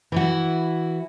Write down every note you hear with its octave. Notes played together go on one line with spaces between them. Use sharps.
E3 E4 F#4